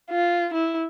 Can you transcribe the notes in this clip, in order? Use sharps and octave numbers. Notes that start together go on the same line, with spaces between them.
F4
E4